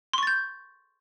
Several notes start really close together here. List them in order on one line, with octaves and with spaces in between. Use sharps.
C6 C#6 A6 G6